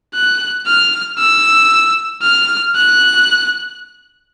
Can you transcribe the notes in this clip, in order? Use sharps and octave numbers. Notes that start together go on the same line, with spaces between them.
F#6
F6
E6
F6
F#6